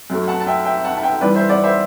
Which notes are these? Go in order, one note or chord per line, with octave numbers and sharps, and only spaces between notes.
F#2 F#3 A3
F#5 A5
A5
E5 G5
E5 G5
F#5 A5
A5
E5 G5
G2 E3 G3 B4 D5
C5 E5
D5 F#5
C5 E5